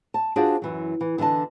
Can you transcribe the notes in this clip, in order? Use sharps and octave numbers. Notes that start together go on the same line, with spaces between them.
A5
D4 F4 F#4 G#4 C5 D5
F#2 E3 F#3
E3
D3 E3 D4 D#5 A5